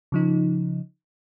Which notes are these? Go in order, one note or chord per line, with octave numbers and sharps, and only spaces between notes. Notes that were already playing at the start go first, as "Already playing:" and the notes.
C#3 F3 D#4